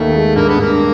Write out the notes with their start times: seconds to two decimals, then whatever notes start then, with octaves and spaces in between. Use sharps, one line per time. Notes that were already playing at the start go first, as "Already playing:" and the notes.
Already playing: D#2 A3
0.15 G#3
0.36 G2 A#3
0.49 B3
0.58 G2 A#3